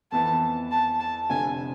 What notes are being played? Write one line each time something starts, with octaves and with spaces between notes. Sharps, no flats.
F2 E3 B3 A5
A5
A5
F1 F2 D3 G#5